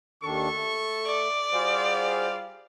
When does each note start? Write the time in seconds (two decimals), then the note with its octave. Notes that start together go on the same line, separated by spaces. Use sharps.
0.23 D#2 D#3 D4 A4 C#6
0.55 A3
1.06 D5
1.53 G3 F4 F#4 G#4 C5 F5